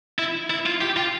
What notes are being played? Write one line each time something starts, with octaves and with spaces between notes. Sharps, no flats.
E4
E4
F4
G4
F4